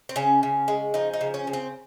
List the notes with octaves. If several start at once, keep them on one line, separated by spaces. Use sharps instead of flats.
C4
C#3 C#4
C#3
G#3
F3 D#4
D#4
C#3
C#4
C#3
C4